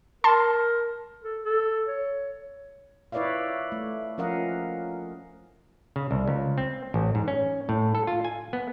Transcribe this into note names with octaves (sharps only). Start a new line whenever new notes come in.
A#4 A5 C6
A4
A4
C#5
E4 B4 C#5 D5 E5 F5
A3
F3 C#4 A#4 D#5 F5 F#5
C#3
C2
C#2
C4
A1
G#2
C#4
A2
A4
F4
G#5
B3